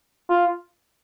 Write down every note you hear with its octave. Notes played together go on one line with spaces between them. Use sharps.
F4